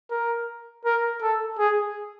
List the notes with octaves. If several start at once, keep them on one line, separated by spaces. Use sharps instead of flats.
A#4
A#4
A4
G#4